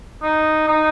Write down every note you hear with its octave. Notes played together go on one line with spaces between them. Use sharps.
D#4
D#4